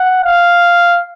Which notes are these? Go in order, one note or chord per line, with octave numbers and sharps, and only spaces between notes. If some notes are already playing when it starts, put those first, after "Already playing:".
Already playing: F#5
F5